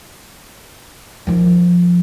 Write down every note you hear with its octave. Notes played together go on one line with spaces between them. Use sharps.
D#3 F3